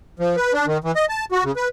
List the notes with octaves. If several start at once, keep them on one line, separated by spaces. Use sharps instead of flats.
F3
B4
D4
D#3
E3
D#5
A5
F#4
C#3
B4